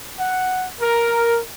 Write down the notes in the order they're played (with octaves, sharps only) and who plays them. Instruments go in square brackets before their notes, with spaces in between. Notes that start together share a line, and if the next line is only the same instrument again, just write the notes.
[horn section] F#5
A#4